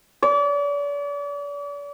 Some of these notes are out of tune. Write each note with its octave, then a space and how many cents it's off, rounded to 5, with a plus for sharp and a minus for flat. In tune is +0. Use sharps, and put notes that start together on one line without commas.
D5 -40